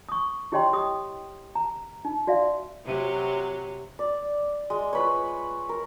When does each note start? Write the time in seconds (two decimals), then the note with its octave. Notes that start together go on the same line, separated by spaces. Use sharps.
0.09 C#6 D#6
0.52 E4 G4 C#5 D#5 G5 C6
0.73 G4 D#6
1.55 A#5
2.05 D#4
2.27 F#4 D5 E5 F5
2.85 C3 F#3
3.99 D5
4.70 G#3
4.93 F4 B4 C#5
5.69 A#4